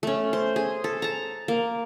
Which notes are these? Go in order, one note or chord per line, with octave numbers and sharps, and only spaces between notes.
A3 C#4
C5
G#4
A4
A5 A#5
A#3